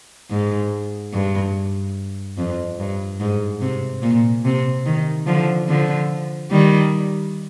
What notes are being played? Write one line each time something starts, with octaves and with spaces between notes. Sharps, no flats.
G#2
G2
F2
G2
G#2
C3
A#2
C3
D#3
D3 F3
D3 F3
D#3 G3